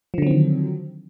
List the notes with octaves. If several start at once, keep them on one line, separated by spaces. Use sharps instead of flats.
D3 D#3 F3 F#3 C4